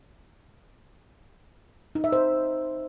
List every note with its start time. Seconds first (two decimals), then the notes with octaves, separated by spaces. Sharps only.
1.95 D#4
2.04 E5
2.12 C5